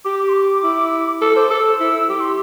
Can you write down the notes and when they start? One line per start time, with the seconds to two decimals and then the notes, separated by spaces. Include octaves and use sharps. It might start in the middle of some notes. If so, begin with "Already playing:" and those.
0.05 G4 D6
0.19 D6
0.29 C6
0.34 D6
0.64 E4
1.22 A4 D6
1.36 C5 D6
1.51 A4 E6
1.80 E4
2.09 G4 D6
2.21 C6